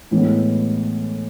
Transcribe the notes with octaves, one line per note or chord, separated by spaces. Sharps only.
A2 E3 G#3 B3